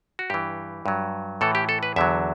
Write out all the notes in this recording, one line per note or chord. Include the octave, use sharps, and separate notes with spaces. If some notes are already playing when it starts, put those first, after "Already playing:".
F#4
G2 E3 G4
G2 F#3
A2 E3 A4
G4
A4
B4
E2 D3 F#3 E5